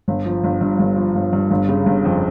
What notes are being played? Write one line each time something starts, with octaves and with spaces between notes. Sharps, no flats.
G1
F3
G1
G2
G1
F3
G1
G2
G1
C#3
G1
F2